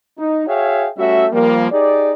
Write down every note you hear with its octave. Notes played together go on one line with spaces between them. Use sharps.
D#4
F#4 G#4 C#5 E5 F5 G5
G3 A3 C#4 F#4 E5
F3 G3 A#3
D#4 G4 G#4 D5